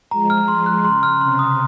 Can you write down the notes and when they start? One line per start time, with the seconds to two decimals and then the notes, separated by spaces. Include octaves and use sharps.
0.11 F3 G#3 A#5
0.30 F6
0.48 C6
0.66 F#6
0.85 C#3 C6
1.03 F6
1.21 C3 C6
1.39 D#6